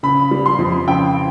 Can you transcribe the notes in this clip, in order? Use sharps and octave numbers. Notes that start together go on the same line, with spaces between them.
C#3 B5
G3
C6
F2
C#3 G5